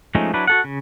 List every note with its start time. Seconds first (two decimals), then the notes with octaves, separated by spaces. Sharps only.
0.15 F3 G#3 A3 C#4 D#4
0.34 F#3 D4 E4 B4
0.47 F#4 A4 F#5
0.64 C#3